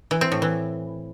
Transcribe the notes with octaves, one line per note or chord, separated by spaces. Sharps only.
E3
C4
A2
E3